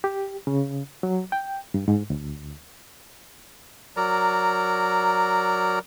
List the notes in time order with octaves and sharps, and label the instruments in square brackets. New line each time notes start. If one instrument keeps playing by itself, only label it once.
[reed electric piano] G4
C#3
F#3
G5
G2
G#2
D2
[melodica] F#3 A#4 D5 A#5